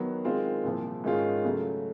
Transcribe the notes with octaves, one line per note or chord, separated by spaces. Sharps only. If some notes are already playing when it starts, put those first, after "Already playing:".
Already playing: D#3 F#3 B3
D#3 G#3 C4 F4
C2 A#2 F3
G#2 D#3 G#3 C#4 F4
C#3 F#3 A3